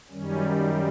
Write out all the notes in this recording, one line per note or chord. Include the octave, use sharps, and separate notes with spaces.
F#2 D#3 G3 C#4